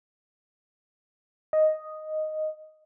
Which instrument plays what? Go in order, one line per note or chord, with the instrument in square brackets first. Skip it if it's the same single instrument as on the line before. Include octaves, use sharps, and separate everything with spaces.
[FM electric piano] D#5